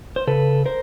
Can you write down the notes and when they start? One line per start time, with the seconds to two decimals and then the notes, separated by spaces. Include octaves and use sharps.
0.16 C5
0.27 C#3 A4 B4
0.66 A#4 C5